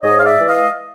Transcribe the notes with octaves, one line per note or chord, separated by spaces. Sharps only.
G#2 C#5 D#5
F5
D5 E5
E3 G#3
D#5 F5